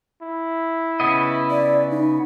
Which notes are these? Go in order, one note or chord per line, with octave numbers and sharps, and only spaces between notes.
E4
C#3 B3 D#5
D5
D#4